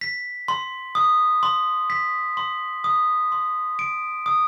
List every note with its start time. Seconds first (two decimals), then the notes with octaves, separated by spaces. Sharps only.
0.01 B6
0.48 C6
0.95 D#6
1.43 C6
1.90 B6
2.37 C6
2.84 D#6
3.32 C6
3.79 D7
4.26 D#6